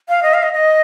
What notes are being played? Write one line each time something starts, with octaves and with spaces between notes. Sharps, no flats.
F5
D#5
F5
D#5
D#5